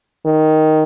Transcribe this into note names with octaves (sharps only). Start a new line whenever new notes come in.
D#3